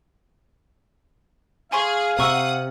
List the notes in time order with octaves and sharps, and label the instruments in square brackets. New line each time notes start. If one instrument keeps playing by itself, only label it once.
[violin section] G#4 [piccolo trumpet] F5 [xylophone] G#5 C6 C#6
[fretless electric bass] C3 [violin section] F#5 D#6 [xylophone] A#5 C#6 E6